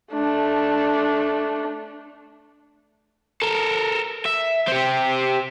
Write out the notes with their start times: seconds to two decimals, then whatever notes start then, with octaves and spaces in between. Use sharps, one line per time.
0.13 A3 D4
3.42 A4 A#4
4.25 E5
4.68 C4 G4